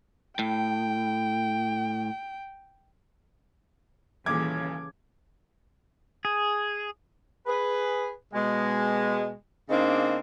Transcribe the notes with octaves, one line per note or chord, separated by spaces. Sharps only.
A2 G5
D#1 A#2 C#3 E3 D6 G#6
G#4
G#4 B4
B2 G#3
C#3 A#3 C4 D4 D#4